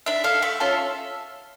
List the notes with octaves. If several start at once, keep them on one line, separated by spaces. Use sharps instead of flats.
D4 E5
A4 F5
A3 E5
C#4 F4 A4